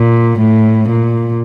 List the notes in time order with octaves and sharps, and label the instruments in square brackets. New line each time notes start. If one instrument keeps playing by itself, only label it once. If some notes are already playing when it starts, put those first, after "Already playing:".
Already playing: [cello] A#2
A2
A#2